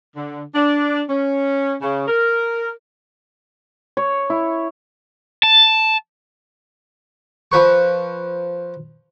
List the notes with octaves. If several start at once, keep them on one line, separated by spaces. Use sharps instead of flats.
D3
D4
C#4
C#3
A#4
C#5
E4
A5
F3 B4 C#6